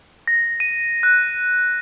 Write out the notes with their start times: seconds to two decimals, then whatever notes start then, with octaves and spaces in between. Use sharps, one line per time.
0.28 A#6
0.60 D#7
1.03 F#6